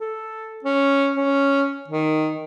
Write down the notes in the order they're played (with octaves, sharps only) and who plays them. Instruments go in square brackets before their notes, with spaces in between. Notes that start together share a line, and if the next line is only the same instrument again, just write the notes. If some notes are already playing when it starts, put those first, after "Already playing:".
[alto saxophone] A4
C#4
C#4
D#3